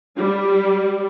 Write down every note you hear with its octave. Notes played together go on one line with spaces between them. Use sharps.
G3